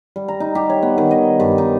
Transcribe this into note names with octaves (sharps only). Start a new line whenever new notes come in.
G3
A#5
D#4
G4
C#5
B3
D#3
D#5
G2
D#4